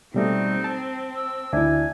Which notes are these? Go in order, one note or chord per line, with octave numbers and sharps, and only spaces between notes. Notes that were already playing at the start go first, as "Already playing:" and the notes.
B2 G3 A3 C4 D#4
A5
E6
D2 D4 E4 E5 G#5